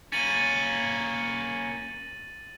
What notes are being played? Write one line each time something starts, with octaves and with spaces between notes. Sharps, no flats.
A#3 C#4 A6 D#7 F#7